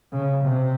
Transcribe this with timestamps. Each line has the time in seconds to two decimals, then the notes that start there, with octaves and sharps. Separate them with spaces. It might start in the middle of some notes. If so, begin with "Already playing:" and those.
0.12 C#3
0.44 C3